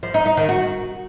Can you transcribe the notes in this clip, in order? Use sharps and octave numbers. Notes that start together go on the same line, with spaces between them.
F3
D#4
D#4
D#3
F#4